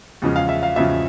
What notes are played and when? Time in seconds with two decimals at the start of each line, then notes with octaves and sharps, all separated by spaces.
0.22 E2 C#3 F3 G#3 C#4
0.36 F5
0.49 E5
0.63 F5
0.76 E2 C#3 F3 G#3 C#4 E5